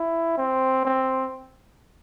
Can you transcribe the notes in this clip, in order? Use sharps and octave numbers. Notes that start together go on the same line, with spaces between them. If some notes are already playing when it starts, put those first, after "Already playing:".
Already playing: E4
C4
C4